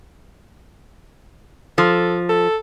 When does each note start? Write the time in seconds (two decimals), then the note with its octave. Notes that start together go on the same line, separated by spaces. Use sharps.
1.78 F3 A4
2.29 A4